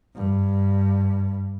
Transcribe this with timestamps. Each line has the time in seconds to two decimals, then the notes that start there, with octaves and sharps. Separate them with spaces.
0.16 G2